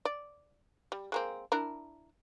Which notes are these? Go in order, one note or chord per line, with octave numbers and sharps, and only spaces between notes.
D5
G3
G#3 A#3 C4
D4 E4 A#4